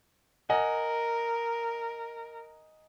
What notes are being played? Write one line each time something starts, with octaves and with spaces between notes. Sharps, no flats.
A#4 D#5 F#5 G#5